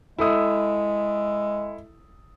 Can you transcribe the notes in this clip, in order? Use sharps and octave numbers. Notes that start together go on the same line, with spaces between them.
G#3 E4 A4 D#6